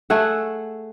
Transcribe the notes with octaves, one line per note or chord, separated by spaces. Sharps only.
A3 G#4 E5 F#5